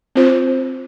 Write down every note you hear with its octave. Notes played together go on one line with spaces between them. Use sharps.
C4 F4 C5